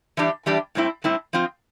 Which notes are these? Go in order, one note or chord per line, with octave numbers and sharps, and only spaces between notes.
E3 G3 D4 G4
E3 G3 D4 G4
A2 G3 C4 E4
A2 G3 C4 E4
F3 C4 F4